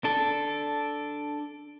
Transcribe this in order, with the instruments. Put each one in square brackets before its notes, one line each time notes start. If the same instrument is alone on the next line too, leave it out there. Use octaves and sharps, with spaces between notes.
[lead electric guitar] D4 A4